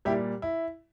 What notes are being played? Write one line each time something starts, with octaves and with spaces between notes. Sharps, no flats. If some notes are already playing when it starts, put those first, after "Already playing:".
A#2 G3 E4 G4
E4